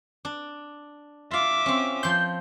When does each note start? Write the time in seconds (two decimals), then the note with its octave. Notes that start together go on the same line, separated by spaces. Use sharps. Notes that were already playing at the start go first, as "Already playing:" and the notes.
0.25 D4
1.31 F4 E5 F5 D6
1.66 C4 C#4
2.03 F3 C6 G6